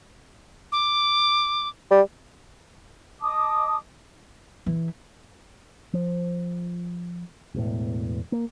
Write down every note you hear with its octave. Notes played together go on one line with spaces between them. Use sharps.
D6
G3
D#5 A5 D6 D#6
E3
F3
E1 E2 A2
A#3